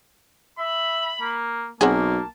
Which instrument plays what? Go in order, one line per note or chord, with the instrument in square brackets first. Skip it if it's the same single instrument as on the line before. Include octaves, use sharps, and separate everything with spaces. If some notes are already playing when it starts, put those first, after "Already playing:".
[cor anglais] E5 [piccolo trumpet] B5
[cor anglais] A#3
[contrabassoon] B1 [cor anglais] A#3 [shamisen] C4 F#4 G#4 [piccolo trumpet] A5